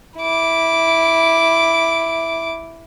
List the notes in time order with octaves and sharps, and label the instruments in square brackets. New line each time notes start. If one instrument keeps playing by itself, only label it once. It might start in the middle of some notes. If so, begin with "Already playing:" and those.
[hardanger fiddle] E4 D6